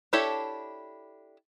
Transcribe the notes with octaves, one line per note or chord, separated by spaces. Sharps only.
D4 E4 G4 A4 C#5